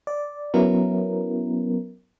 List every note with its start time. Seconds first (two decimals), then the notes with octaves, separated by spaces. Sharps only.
0.07 D5
0.54 F#3 B3 C#4 E4 A#4